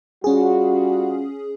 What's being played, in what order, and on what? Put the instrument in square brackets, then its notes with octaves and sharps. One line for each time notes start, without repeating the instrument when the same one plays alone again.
[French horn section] G3 F4 F#4 [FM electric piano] C#4 G#4